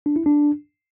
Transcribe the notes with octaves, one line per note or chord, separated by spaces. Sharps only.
D4
E4
D4